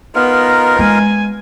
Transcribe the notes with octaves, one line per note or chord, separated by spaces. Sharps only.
B3 D#4 F4 A#4
G#3 G#5